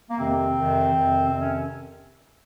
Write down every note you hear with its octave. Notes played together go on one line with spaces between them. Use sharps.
A#3
F2 C3 D#3 C4
F2 C3 D#3
F2 C3 D#3
F2 C3 D#3 C4
C#4